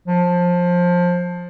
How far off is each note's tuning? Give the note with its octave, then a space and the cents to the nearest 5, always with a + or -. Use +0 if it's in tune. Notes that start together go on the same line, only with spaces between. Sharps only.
F3 +20